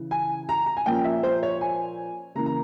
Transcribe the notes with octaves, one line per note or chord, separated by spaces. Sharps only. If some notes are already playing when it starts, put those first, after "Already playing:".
Already playing: C#3 E3
G#5
A#5
A#5
G#5
A#2 F3 A#3 C#4 G5
E5
C5
C#5
G#5
C#3 E3 A#3 E4 A#5
A#5